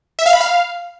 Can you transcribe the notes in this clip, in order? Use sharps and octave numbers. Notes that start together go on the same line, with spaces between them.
E5
F5
B5
F5